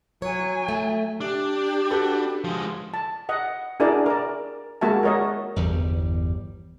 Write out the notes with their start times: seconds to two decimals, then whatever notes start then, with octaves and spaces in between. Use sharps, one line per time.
0.22 F#3 C#5 G#5
0.69 A3
1.21 D4 G4
1.90 F#4 A4 B4
2.44 F3 G#3
2.94 A5
3.29 D#5 F#5
3.80 D4 E4 F#4 G#4 A#4 D5
4.06 A#4 D5
4.81 G#3 A#3 F#4 E5 A5
5.03 F#4 A#4 C#5 D#5
5.56 G1 E2 G3